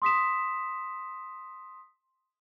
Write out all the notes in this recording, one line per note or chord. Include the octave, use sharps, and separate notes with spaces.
C6 D#6 B6 E7